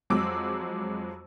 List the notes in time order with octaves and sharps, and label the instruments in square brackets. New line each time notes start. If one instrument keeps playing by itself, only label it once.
[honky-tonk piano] F2 F#3 G#3 D6 E6